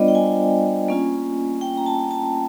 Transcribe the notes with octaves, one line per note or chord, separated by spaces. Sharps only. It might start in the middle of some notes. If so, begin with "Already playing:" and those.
Already playing: G3 B3 D4 F4 C5 D5 D#5
G5
G#5
A#3 C#4 F4
G5
A#5
A5
A5